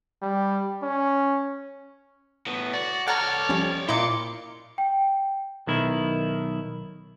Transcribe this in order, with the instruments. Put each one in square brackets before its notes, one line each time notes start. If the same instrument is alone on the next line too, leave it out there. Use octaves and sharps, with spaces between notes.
[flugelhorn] G3
C#4
[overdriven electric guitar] A2 B3
[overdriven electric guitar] F#4 [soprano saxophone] D5
[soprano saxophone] A4 [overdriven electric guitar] C#5 D5 [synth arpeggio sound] F#5 A#5 [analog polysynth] F6
[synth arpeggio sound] F3 G3 C#4
[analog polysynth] A#2 D6 C#7 [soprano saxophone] C4 [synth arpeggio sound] E4 D#5 [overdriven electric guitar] C6
[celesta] G5
[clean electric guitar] B1 D#3 E4